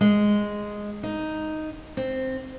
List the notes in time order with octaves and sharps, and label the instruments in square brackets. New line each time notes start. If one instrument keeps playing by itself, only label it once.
[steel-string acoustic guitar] G#3
D#4
C4